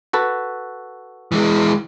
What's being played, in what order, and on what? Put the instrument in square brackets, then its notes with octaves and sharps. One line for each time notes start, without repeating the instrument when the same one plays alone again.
[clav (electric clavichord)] F#4 A4 B4
[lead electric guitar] E3 G#3